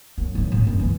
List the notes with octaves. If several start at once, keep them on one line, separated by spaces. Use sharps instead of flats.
F#2
G#1 F#3
A2 C4
F#2 G#3
E3 C#4